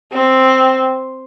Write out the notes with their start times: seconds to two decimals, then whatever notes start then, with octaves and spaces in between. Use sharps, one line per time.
0.12 C4